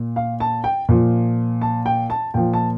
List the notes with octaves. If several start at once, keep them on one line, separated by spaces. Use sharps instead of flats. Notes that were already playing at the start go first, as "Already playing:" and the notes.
Already playing: A#2
F5
A5
G5
A#2 F3
A5
G5
A5
A#2 F3 G5
A5